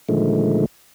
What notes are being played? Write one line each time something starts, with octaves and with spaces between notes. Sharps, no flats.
A#2 D3 D#3 F3 G#3 A3